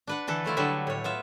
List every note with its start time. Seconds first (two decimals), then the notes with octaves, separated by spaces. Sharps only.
0.07 D4 B4 F#5
0.27 D3 E3 A4 B4
0.44 F#3 A3 E4 F4
0.57 D3 F#3 G3 B4 E5
0.87 A2 C#5
1.04 B3 F4 E5